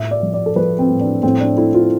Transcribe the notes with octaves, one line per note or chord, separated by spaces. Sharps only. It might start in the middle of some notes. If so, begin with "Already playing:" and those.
Already playing: A2 E5
D5
F3
D5
A4
F3 B4
C4
A2
D4
A2 C4
D4
A3 E4
F4